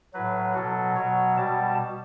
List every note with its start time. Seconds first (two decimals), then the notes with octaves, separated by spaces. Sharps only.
0.13 A2 F#3 B4
0.54 B2 F#3 A4
0.96 B2 F#3 C#5
1.37 B2 G3 A5